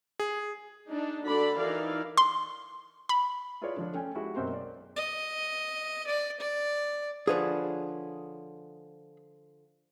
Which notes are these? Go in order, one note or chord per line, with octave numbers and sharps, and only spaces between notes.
G#4
D4 D#4
D3 D4 F#4 A4 D5 B5
E3 D#4 A#4 D5 F5
C6
B5
E4 F4 G#4 B4 C#5 D5
D3 F3 D4
A3 C#4 G5 G#5
G#3 E4 F#4 G4
B1 F#2 A#3 C4 C5 C6
D5
D#5
D5
D5
D3 F3 G#4 B4 C#5